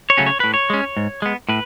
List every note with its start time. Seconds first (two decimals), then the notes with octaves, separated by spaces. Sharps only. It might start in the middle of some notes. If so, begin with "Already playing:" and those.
0.10 C#5
0.18 C#3 F#3 A3 C#4
0.26 C#5
0.40 A2 B4
0.54 C#5
0.70 G#3 C#4
0.97 G#2
1.22 G#3 B3
1.49 A2 B4